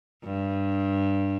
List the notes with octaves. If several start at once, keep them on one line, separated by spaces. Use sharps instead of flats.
G2